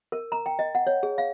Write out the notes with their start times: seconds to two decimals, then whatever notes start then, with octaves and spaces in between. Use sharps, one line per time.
0.12 A#4
0.32 A#5
0.46 G5
0.59 D#5
0.75 F#5
0.87 C#5
1.03 G#4
1.18 F5